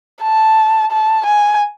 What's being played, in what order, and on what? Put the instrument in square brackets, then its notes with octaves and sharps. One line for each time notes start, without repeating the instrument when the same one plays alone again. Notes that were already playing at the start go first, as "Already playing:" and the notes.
[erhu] A5
A5
G#5